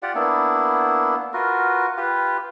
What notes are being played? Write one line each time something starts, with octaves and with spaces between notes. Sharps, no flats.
F4 G4 D5 F#5
A#3 B3 D4 E4
F4 F#4 A#4 B4
F4 G4 B4